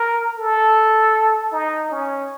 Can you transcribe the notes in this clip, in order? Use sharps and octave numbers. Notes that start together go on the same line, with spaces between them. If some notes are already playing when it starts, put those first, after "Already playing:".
Already playing: A#4
A4
D#4
C#4